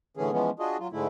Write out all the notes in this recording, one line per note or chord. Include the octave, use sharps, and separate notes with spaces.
A2 D3 E3 C#4 G#4
E3 F3 G#3 B3 C#4
D4 F4 F#4 G#4 D#5
F#3 F4
G#2 D3 G#3 A3 E4